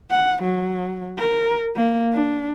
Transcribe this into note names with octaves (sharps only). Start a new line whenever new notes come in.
F#5
F#3
A#4
A#3
D4